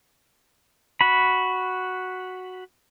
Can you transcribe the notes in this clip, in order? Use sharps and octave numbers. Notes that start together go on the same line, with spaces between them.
F#4 B5